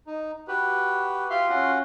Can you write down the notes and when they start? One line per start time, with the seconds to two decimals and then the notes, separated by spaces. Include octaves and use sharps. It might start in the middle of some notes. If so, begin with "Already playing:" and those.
0.07 D#4
0.48 F#4 G4 B4
1.30 F4 G4 E5 F5 C6
1.50 C#4 F#4 F#5